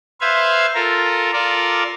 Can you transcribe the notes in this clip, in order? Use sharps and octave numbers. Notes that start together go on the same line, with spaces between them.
B4 C5 E5 F5 G#6
F4 A4 A#4
F4 A4 A#4 D5